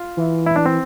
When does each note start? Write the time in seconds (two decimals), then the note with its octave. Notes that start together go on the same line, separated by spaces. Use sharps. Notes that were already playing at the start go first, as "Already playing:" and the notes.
Already playing: F4
0.17 E3
0.46 E4
0.56 D4
0.66 C4